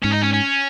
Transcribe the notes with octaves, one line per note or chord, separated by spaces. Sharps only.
G#2 C#4
D#4
C#4
C#4